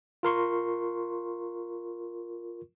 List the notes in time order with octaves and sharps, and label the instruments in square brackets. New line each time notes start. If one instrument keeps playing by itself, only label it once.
[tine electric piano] F4 A#4 C6 C#6